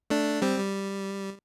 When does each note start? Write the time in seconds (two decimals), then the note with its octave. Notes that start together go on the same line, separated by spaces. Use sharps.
0.10 A3 D4
0.42 G3 C4
0.58 G3